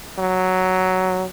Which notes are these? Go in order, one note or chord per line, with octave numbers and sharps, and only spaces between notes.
F#3